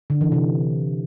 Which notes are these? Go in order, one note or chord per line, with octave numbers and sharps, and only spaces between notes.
D3
E3
C3